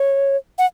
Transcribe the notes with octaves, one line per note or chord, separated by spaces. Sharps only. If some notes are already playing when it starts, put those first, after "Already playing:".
Already playing: C#5
F#5